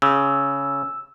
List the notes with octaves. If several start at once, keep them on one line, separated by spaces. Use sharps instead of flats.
C#3 E6